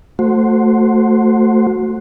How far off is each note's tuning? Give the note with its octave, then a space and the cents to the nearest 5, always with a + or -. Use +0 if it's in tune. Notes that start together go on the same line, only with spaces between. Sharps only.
A3 +10 F#4 -10 C5 +0